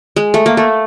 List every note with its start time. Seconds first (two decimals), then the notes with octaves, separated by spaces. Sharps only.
0.16 G#3
0.34 A3
0.46 A#3
0.57 A3